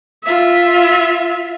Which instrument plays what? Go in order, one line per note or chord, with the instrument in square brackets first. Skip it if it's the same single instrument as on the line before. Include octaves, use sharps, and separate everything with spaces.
[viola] F4 E5